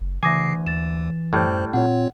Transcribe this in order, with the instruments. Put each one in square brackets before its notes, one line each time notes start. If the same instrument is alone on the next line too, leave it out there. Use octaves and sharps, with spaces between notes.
[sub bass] F#1
[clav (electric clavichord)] D2 G#5 [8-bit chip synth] C#3 C7 [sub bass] E3 [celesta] D6 D#6 A#6
[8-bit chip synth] D#2 [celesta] A6 E7
[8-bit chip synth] F#2 C5 [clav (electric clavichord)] A2 G3
[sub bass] A#2 [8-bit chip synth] C4 F4 C#5 [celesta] F#5